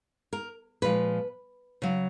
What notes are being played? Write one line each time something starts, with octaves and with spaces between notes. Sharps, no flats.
A#4
A#2 F3 G#3 B4
C#3 F#3